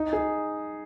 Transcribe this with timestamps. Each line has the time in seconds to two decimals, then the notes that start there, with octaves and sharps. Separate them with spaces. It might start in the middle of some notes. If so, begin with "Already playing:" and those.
Already playing: D#4
0.13 G#4